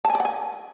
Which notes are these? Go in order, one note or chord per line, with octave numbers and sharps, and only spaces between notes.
A5
G#5
D5
F#5
G#5